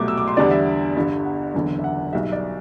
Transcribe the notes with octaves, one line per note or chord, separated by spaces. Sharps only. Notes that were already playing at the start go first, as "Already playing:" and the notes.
Already playing: C2 B2 F#3 A3 D6
E6
D6
C6
E2 D3 G3 B3 D4 D5
E5
G1 G2 D3
F#5
F#1 E2 D3
E5
F#5
B1 B2 G3 E5
E5
D5